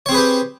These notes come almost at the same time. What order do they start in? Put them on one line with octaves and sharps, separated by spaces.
C#5 C4 G#4 B4 G4